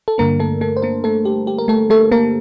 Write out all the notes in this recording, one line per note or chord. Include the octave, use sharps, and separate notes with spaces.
A4
G2 D3 G3 A#3 D4 A#4
A3 A4
A3 A4
C5
A#3 A#4
A3 A4
G4
G4
A#4
A3 A4
A3 A4
A#3 A#4